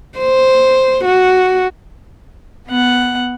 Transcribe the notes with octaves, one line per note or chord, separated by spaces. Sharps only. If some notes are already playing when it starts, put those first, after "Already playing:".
C5
F#4
B3 F#5